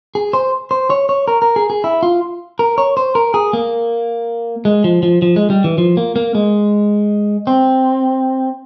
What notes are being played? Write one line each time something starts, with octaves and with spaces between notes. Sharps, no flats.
G#4
C5
C5
C#5
C#5
A#4
A#4
G#4
G#4
E4
F4
A#4
C#5
C5
A#4
G#4
A#3
G#3
F3
F3
F3
G#3
G3
E3
F3
A#3
A#3
G#3
C4